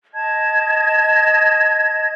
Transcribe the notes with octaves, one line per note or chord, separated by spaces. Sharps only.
D#5 A5 G#6